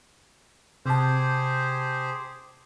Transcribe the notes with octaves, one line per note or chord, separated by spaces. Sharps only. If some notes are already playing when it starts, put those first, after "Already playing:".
C3 G4 G#4 C5 A5